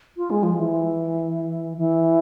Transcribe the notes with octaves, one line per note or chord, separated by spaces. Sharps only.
F4
G#3
F3
E3
E3